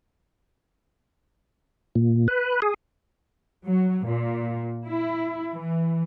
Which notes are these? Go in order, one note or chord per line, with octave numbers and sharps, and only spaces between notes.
A#2
B4
G#4
F#3
A#2
E4
E3